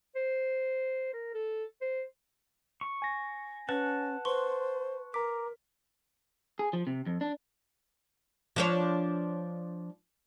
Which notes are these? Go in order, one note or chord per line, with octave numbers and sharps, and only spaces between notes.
C5
A#4
A4
C5
C#6
G#5 A#6
C#4 B4 F#5 A5
B4 C5 C6 C#6
A#4 A#5 D6 B6
G#4
F3
C3
F2
D4
F3 D4 C#5